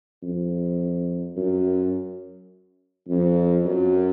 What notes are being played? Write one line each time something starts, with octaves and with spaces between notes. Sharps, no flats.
F2
F#2
F2
F#2